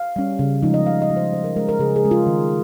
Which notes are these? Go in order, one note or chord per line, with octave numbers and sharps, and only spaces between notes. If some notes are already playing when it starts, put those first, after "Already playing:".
Already playing: F5
G3 C#4
C#3
F3 G#3 D#4
D#5
C#3 F5
D#5
F3 G#3 D#4
C5
C#3 C5
A#4
G#3 C#4 A#4
A#4
C#3 G#4
G#4
G#3 C#4
F4
D#3